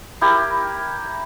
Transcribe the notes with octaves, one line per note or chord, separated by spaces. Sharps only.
E4 G4 A#4